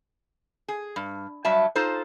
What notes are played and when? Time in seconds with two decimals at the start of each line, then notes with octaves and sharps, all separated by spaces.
0.68 G#4
0.96 G2
1.45 G2 F#3 G3 E5 A5
1.75 D#4 F4 A4 C5